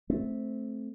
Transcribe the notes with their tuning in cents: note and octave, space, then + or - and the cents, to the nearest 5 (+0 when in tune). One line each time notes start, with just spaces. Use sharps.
A3 -15 C4 +0